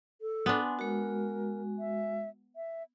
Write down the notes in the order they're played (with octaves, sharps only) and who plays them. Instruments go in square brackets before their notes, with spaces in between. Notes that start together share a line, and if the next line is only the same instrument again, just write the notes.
[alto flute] A4
[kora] B3 D4 [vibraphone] G#5 C6
[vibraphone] G#3 F#4 [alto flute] A#4
[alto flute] E5
E5